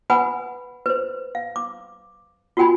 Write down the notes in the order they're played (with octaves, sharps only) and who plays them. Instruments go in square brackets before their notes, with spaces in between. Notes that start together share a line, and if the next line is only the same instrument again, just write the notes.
[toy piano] B4 F#5 G#5 B5 D#6
B4 C5
F5
D6
F4 F#4 A#4 G5 G#5 B5